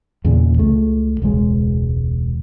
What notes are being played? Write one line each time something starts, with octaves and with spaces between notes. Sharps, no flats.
E2 A#2 C#3
C#2 A3
E1 C#2 G#3